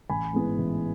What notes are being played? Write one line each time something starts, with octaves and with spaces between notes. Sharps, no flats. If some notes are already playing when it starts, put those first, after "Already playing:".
A1 G#5 B5
G#2 E3 G#3 B3
A1